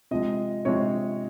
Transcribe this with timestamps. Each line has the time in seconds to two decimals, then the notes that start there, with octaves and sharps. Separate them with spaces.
0.11 C3 F3 G#3 D#5
0.65 C3 F3 G#3 C#5